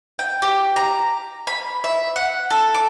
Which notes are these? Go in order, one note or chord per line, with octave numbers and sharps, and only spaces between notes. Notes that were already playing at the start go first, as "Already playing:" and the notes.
G5
G4
A#5
B5
E5
F#5
A4
D6